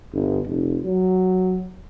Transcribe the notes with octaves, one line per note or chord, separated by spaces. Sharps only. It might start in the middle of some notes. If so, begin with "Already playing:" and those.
G1
F1
F#3